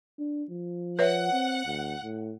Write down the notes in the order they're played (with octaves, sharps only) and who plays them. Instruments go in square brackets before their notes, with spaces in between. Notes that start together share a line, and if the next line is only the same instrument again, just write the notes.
[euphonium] D4
F3
[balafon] B4 C#5 E5 [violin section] F#5
[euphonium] C4
D2
A2